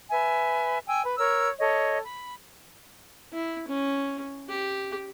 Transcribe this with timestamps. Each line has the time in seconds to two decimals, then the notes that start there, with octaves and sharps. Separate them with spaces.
0.11 B4 E5 G#5
0.86 G5 G#5 E6
1.02 B4
1.18 A#4 C#5 E6
1.60 A4 C#5 D#5
2.03 B5
3.33 E4
3.68 C#4
4.49 G4